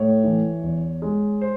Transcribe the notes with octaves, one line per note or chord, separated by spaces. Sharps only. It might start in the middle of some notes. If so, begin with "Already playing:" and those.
Already playing: A2 C#5
E3
E2
G#3
C5